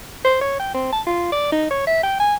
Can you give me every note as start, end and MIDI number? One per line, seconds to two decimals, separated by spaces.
0.25 0.38 72
0.41 0.55 73
0.60 0.70 79
0.74 0.92 60
0.93 1.02 81
1.07 1.30 65
1.32 1.48 74
1.52 1.69 63
1.71 1.84 73
1.87 2.02 76
2.03 2.16 79
2.20 2.35 80